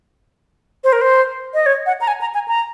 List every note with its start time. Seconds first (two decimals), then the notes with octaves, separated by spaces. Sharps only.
0.84 C5
0.93 A#4
1.01 C5
1.54 D#5
1.66 C#5
1.86 F#5
2.01 A#5
2.08 G#5
2.21 A#5
2.34 G#5
2.48 A#5